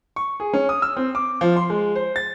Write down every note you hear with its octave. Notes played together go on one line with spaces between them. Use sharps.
C#6
G#4
C#4
D#6
E6
C4
D6
F3
C6
G#3
C5
A6